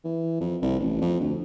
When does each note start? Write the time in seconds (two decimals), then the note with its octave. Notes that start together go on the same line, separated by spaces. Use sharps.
0.04 E3
0.40 F2
0.62 C2
0.80 A1
1.01 F2
1.20 D2